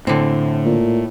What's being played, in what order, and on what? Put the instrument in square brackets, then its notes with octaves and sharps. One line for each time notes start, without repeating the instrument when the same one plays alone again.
[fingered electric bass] A2 [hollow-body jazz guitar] D3 C4
[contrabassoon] A#2